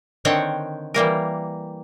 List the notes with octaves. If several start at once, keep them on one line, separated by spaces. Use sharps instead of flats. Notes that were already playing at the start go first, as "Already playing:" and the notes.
D3 D#3 C4 C#5 F#5 G5
E3 G3 A#3 A#4